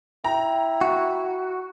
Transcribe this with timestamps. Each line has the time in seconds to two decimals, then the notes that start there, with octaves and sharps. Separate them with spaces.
0.24 E4 G5 A#5
0.81 F#4